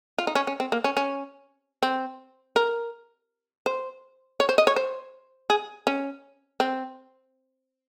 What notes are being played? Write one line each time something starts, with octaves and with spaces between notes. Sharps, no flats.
F4
D#4
C#4
C#4
C4
A#3
C#4
C#4
C4
A#4
C5
C#5
C5
D#5
C#5
C5
G#4
C#4
C4